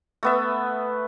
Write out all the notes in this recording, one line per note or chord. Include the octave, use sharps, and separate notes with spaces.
A3 B3 E5